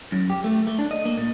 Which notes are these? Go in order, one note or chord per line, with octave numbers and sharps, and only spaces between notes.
F#2
G4
A3
A3
D4
D#5
A#3
A#2